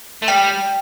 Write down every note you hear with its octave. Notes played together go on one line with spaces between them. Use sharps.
A3
G3 G5